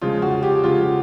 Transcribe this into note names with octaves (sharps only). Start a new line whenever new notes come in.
C#3 F3 G#3 F4
F#4
G4
C#3 F3 G#3 F4